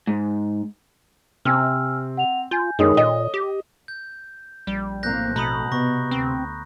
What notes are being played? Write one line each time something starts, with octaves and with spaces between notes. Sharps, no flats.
G#2
C3 C4 G#5 E6 F6
F#5 F7
F4 G#5 G6
F#2 D#3 G#3 D#4 A4 C#5 D#6
A#2 D#5
G4
G6
A#1 G3
A2 A#3 C4 F#6 G6 A#6
B2 A3 A#5 B5 D#6
C3 B3 C#6 A#6
D2 C4